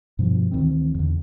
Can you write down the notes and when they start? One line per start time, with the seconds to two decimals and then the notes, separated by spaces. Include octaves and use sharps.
0.19 G2 B2 F3
0.51 D2 D#3 E3 C4
0.95 E2 D3